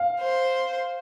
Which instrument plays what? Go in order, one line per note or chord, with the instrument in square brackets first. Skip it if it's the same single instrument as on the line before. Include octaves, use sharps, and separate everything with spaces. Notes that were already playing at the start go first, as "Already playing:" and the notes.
Already playing: [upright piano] F5
[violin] C5